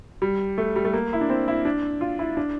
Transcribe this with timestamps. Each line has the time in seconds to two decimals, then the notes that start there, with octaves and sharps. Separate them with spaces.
0.22 G3
0.58 A3
0.76 G3
0.85 A3
0.93 A#3
1.13 E4
1.21 D4
1.29 C4
1.48 E4
1.65 D4
2.01 F4
2.19 E4
2.37 D4